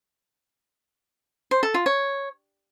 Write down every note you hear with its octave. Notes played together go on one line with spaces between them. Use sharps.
C5
A4
F4
C#5